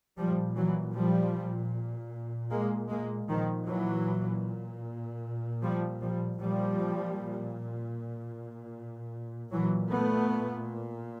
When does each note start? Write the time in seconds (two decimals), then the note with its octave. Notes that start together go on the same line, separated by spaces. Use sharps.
0.17 A#2 F3 G3
0.56 E3 F#3
0.95 F3 G3
2.51 G#3 A#3
2.90 G#3 A#3
3.29 A#2 D#3 F3
3.68 E3 F#3
5.62 F3 G3
6.02 F3 G3
6.41 A#2 F3 G3
9.52 A#2 E3 F#3
9.91 A3 B3